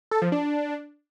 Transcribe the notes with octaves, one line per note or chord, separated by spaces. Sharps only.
A4
F3
D4